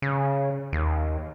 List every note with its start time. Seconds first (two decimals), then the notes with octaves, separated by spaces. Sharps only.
0.02 C#3
0.73 D#2